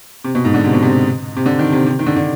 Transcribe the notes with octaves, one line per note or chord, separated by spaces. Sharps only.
C3
B2
G#2
D3
C3
B2
C3
C3
D3
D#3
C3
C3
D#3
D3
D3